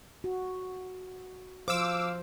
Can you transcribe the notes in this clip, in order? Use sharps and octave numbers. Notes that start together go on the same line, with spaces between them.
F#4
F3 C5 F5 D6 E6